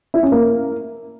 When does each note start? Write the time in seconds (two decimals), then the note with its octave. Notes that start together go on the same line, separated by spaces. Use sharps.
0.14 E4
0.23 C#4
0.32 A#3